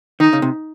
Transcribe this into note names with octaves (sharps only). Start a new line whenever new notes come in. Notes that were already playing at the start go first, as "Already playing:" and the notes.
D#3 D#4
C#3
C3